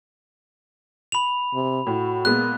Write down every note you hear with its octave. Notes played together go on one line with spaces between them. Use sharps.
B5 F7
C3
A2 F#4
A#2 G#3 B3 F#6